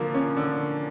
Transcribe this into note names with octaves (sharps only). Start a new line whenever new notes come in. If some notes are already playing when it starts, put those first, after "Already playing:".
Already playing: D3 F3 A#3
C#4
D3